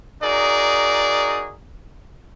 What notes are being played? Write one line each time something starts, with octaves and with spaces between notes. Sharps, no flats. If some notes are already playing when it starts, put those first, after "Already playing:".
D#4 F#4 G#4 A#4 D5